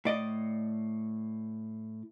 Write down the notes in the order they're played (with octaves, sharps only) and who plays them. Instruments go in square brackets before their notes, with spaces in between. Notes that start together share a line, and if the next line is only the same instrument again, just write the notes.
[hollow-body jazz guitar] A2 D5 D#5